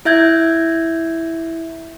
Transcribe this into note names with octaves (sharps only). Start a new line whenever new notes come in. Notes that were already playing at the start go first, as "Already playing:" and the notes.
E4 E5 G6 G#6